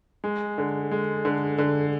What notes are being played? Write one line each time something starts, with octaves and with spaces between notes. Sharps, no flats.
G#3
D3
G#3
D3
D3